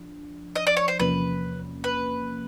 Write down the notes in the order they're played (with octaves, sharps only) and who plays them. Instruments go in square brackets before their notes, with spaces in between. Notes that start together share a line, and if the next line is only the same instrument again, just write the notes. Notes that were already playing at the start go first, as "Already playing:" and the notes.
Already playing: [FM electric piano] F3 D4
[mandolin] D#5
D5
C#5
C5
[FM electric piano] E2 C3 F3 A#3 C#4 [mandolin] B4
[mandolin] B4